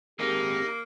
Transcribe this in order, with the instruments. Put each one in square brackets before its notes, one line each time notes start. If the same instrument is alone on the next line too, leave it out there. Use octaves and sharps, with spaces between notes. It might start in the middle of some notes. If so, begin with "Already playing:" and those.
[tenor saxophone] A#3 [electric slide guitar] C4 G#4 A#4 [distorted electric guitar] D#4 [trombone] G4